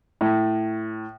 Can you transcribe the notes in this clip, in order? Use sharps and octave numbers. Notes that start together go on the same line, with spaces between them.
A2